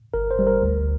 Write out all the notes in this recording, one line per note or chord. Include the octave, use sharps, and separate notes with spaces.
G1 A#4
C5
G3
A#4
D2